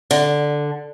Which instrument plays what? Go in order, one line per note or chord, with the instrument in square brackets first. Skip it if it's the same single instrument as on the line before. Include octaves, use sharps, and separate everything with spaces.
[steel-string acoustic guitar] D3